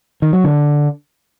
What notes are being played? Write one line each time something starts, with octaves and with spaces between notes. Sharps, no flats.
D#3
F#3
D3